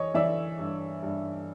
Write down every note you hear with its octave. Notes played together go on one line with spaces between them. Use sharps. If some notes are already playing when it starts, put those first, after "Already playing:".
Already playing: E3 C#5 D#5
E3 D5 E5
G2
G2